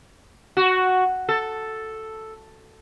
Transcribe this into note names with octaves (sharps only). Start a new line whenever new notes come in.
F#4
A4